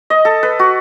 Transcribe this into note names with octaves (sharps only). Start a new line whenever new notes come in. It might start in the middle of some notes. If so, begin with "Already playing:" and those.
D#5
A4
B4
F#4